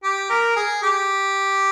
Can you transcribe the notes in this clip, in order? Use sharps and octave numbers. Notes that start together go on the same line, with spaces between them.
G4
A#4
G#4
G4